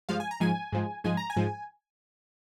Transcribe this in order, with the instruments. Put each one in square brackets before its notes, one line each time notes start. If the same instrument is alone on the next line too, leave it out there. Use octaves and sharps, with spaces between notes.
[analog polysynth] G2 F3 G#3 F5
G#5
A#5
G#2 F3 G#3 G#5
G#2 F3 G#3
G#2 F3 G#3 G#5
A#5
G#5
G#2 F3 G#3